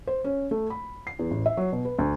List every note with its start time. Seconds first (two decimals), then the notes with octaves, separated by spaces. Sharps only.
0.07 C5
0.24 C#4
0.51 A3
0.70 B5
1.07 C7
1.19 E2
1.31 A1
1.46 E5
1.57 F#3
1.72 B2
1.85 B4
1.98 D2